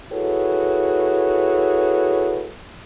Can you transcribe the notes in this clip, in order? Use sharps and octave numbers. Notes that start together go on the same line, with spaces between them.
E4 F#4 G#4 A4 B4 C#5